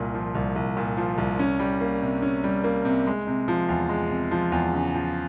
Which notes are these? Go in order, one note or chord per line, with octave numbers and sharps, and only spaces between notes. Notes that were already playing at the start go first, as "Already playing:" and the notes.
Already playing: C2 A#2
F3
C2
C2
A#2
F3
C2
C#4
G3
A#3
C3
C#4
G3
A#3
C3
G#3
C3
F3
E2
G#3
C3
F3
E2
C#3
F3